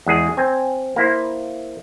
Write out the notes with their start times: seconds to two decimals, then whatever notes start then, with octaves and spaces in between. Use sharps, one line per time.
0.06 E2 G#3 G#4
0.37 C4 G#5
0.96 A#3 E4 C5